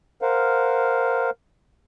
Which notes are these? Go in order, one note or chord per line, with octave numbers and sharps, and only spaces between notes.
A#4 C5 F5 F#5